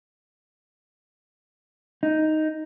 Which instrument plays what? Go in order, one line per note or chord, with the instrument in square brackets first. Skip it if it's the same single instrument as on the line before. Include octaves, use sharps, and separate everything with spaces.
[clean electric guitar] D#4